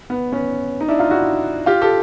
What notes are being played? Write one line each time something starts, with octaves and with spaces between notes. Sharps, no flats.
B3
B3 C#4
D#4
D4 E4
D#4 F4
E4 F#4
F4 G4
G4 A4